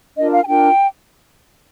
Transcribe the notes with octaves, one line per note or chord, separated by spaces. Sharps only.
D4 F4 A#4 D#5
F5
G#5
D4 F4 A#4 G5